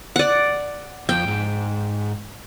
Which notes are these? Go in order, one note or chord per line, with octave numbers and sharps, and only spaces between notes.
D5 F#5
F2 G5
G#2